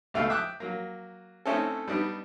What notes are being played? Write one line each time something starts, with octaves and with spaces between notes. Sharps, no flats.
C#2 B2 A3 F5 G5
E5 G5 D6 D#6 F#6
F#3 A#3
A3 C4 C#4 D#4 E4 A4
G3 B3 D4 D#4